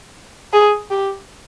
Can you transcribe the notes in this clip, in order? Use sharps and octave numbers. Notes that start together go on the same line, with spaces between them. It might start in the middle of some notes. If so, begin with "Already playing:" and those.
G#4
G4